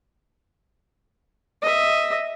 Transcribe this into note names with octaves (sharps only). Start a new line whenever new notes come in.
D#5 E5